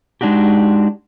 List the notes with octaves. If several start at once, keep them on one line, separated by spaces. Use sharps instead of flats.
G#3 D4 D#4 F#4 G4